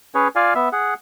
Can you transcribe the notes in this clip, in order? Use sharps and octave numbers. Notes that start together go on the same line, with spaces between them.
C#4 G#4 B4 C#5
F4 D5 F5 G#5
B3 E5
G#4 F#5